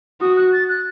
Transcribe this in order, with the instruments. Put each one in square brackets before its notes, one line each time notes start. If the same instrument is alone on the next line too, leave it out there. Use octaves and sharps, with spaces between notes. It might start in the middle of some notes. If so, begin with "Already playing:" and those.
[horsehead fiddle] F#4 [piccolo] D#6
[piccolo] F#6
A6
F#6